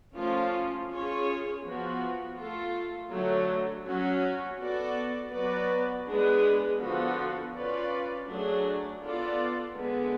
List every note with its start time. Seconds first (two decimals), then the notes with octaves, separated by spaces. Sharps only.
0.16 F3 A3 C#4 F4
0.89 C#4 F4 G#4 C#5
1.64 F3 B3 F#4
2.37 A3 F4 A4
3.11 D3 F#3 A3
3.85 F#3 C#4 F#4
4.59 B3 F#4 A4 D5
5.32 F#3 B3 F#4 B4 D5
6.06 G#3 B3 D4 G#4 B4
6.80 D3 F3 B3 F#4 A4
7.54 C#4 F4 B4 D5
8.28 F#3 A3 D4 G#4
9.01 B3 F4 A4 D5
9.76 D3 G#3 B3